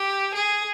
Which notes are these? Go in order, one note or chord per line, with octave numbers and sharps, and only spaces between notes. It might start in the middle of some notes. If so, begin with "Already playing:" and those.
Already playing: G4
G#4